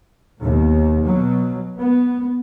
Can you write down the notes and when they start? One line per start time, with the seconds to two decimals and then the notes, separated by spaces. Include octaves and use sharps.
0.40 D#2 B2
1.05 B2 F#3
1.78 B3